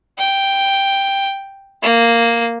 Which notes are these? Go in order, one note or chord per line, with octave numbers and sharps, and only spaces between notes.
G5
A#3